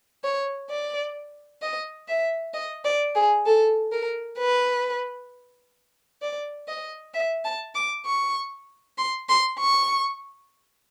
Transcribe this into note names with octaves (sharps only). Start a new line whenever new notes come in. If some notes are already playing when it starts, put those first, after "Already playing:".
C#5
D5
D#5
E5
D#5
D5
G#4
A4
A#4
B4
D5
D#5
E5
A5
D6
C#6
C6
C6
C#6